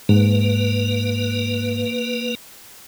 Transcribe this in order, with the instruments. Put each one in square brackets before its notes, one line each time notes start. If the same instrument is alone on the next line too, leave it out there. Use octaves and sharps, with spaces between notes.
[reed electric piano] G#2 [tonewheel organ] A#3 B4